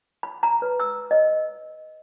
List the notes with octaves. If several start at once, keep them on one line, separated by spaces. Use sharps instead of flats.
B5
A#5
B4
E6
D#5